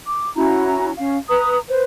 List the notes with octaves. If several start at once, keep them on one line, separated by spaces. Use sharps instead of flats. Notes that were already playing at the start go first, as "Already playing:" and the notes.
D6
C#4 E4 F#4 A#5
C#4 F5
B4 A#5 D#6
B4 C5